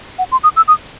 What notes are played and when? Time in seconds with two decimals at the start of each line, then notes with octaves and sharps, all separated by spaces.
0.19 F#5
0.32 C6
0.44 D#6
0.57 E6
0.68 D#6